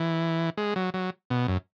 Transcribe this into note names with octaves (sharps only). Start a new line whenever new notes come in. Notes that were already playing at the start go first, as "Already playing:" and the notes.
Already playing: E3
G#3
F#3
F#3
B2
F#2